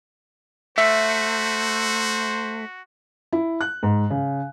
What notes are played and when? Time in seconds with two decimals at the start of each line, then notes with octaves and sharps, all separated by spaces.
0.78 A3 F#4 C5 E5
3.32 E4
3.61 F#6
3.83 G#2
4.10 C#3